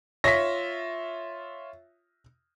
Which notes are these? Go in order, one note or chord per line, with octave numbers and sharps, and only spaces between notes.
F4 C#5 E5 A#6 B6